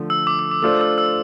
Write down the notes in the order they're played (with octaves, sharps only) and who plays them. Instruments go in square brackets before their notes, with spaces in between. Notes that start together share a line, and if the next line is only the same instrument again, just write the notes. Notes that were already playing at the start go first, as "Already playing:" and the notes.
Already playing: [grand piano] D3 F3 A3
[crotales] E6
D6
D6
D6
[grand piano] A3 D4 F4 A4 C5 [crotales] D6
[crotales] E6
E6